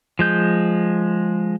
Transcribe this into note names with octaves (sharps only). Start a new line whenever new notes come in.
F3 G#3 G6